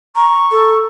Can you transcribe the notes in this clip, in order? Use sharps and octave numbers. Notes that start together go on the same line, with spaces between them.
A#5 C#6
A4